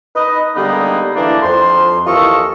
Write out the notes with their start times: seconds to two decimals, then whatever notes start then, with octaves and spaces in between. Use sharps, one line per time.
0.16 D#4 B4 D#5
0.56 D3 G3 G#3 A#3 B3 D#4
1.16 D3 E3 A3 A#3 D4
1.43 F2 C6
2.07 D#2 E3 F4 A4 D#5 C#6